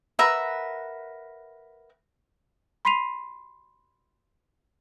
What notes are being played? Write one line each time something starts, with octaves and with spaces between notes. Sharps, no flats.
A#4 B4 E5 F#5
B5 C6 B6 C7 D#7 F7